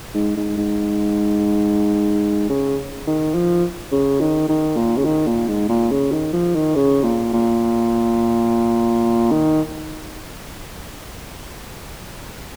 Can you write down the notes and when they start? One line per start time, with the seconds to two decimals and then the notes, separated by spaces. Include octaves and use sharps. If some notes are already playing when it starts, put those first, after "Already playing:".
0.14 G#2
0.37 G#2
0.58 G#2
2.50 C#3
3.07 D#3
3.34 F3
3.92 C#3
4.21 D#3
4.49 D#3
4.76 A#2
4.98 C#3
5.05 D#3
5.27 A#2
5.48 G#2
5.69 A#2
5.91 C#3
6.12 D#3
6.33 F3
6.55 D#3
6.76 C#3
7.04 A#2
7.33 A#2
9.31 D#3